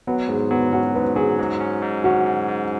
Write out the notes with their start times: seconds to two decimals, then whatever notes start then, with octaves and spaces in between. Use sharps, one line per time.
0.07 F#3 B3
0.28 G#2 G#3
0.51 F#3 B3
0.72 C#4 F#4
0.94 G#2 B4
1.16 F#3 G#4
1.39 G#2
1.60 C#4
1.82 G#2
2.04 C#4 F#4
2.27 G#2
2.49 G#2